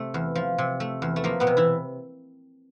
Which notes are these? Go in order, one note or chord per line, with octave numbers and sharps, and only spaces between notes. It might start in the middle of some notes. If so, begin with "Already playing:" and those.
Already playing: C3 A3
E2
F3
C3
A3
E2
A3
F3 A#3
B2 B3
C3
E3 E4